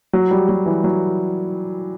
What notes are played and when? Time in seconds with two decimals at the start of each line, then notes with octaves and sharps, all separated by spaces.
0.13 F#3
0.31 G3
0.49 F#3
0.66 E3
0.84 F#3